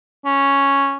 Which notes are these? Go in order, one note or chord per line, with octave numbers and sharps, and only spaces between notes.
C#4